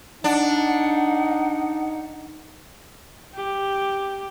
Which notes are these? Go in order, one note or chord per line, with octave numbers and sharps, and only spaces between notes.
D4 D#4 F#5
G4